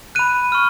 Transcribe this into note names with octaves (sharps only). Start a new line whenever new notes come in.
B5 F#6 D#7
C#6 F6